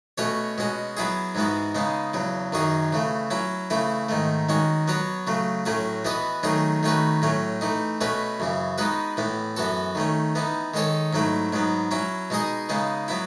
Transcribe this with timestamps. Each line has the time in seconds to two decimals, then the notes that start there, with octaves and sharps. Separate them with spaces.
0.18 B2 A3 C#4 F#4 C#5
0.58 B2 G#3 C#4 F#4
0.97 F#3 B3 E4 G#4
1.35 G#2 E3 G#3 B3 F#4
1.75 C#3 G#3 B3 D#4
2.14 E2 C#3 F#3
2.53 F#2 D#3 F#3 C#4 G#4
2.92 C#3 E3 A3
3.31 F#3 C#4 E4
3.70 C#3 E3 A3 E4
4.09 G#2 D#3 A3
4.49 D#3 G#3 C#4 F#4
4.88 F#3 B3 F#4 C#5
5.27 C#3 F#3 A3
5.65 A2 F#3 A3 C#4 F#4
6.05 E3 B3 F#4 B4 D#5
6.43 D#3 F#3 A3 C#4 G#4
6.83 D#3 A3 C#4 F#4 B4
7.22 A2 F#3 A3 C#4
7.61 E3 A3 D#4
8.01 B2 A3 C#4 F#4 B4
8.40 F#2 C#3 E3
8.78 G#3 B3 D#4 F#4 B4
9.17 A2 E3 B3
9.57 F#2 E3 B3 F#4 A4
9.95 D#3 A3 C#4
10.35 E3 B3 D#4
10.74 D#3 G#3 D#4 A4 C#5
11.13 G#2 F#3 A3 E4
11.53 G#2 F#3 B3
11.91 F#3 C#4 E4
12.30 B2 G#3 D#4 G#4 D#5
12.69 C#3 G#3 B3 D#4
13.08 F#3 B3 E4